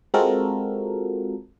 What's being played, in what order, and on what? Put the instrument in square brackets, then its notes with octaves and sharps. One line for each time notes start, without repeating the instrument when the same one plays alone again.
[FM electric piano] G#3 C4 F4 F#4 A4 A#4